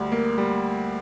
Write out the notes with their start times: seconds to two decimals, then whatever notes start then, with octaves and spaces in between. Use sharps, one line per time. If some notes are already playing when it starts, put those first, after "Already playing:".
Already playing: D2 G3
0.12 A#3
0.38 G3